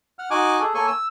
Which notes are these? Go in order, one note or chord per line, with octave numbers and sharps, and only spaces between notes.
F#5 F6
D#4 F#4 G#5 D6 F#6
G#4 A4
A#3 A4 C#5 G#5 C#6
E6